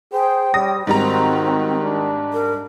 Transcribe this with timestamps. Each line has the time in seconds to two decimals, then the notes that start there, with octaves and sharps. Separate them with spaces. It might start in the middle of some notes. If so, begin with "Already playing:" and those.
0.13 G#4 C5 G5
0.54 G3 C#5 D#6 A#6
0.87 G#2 D#3 G3 C4 F#4 A#5
1.83 D4
2.33 A#4